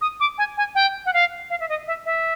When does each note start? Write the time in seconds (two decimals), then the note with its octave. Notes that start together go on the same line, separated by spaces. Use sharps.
0.01 D#6
0.20 D6
0.38 G#5
0.57 G#5
0.75 G5
1.06 F#5
1.13 F5
1.50 F5
1.60 E5
1.69 D#5
1.87 E5
2.06 E5